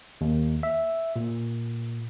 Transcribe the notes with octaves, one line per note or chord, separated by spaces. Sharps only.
D#2
E5
A#2